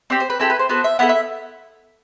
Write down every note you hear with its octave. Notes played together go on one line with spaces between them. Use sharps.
C4 G4 D5
C5
B4
C4 E4 G4 A4
B4
C5
B3 F#4 A4 C5
E5
B3 E4 A4 F#5
E5